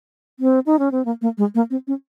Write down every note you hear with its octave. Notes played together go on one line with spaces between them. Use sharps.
C4
D#4
C#4
C4
A#3
A#3
G#3
A#3
C4
C#4